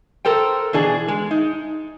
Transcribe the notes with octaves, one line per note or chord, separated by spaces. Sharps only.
A4 A#4 C5 G5
B2 E3 D4 G#4
G#3
D#4